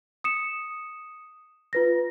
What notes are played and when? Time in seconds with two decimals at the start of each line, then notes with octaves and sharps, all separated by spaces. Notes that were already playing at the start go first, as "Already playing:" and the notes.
0.24 D#6 C#7 E7
1.73 F4 B4 A#6